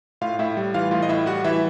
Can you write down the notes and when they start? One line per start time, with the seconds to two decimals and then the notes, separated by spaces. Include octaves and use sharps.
0.21 A2 F4 F5
0.39 A2 E4 E5
0.57 G3
0.74 E3 F4 F5
0.91 A2 F4 F5
1.02 D#5
1.09 A2 E4 E5
1.26 G3 F#4 F#5
1.44 E3 E4 E5